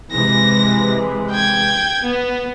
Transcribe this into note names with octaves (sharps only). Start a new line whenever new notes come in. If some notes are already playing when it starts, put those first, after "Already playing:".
C3 E3 G#3 A#6
G5 G#6
B3